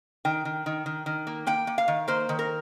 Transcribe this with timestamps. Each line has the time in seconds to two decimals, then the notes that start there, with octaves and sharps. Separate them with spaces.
0.25 D#3 G5
0.45 D#3
0.66 D#3
0.86 D#3
1.06 D#3
1.27 A#3
1.47 A#3 G5
1.67 A#3
1.78 F5
1.88 D#3
2.08 A#3 C5
2.29 D#3
2.39 A#4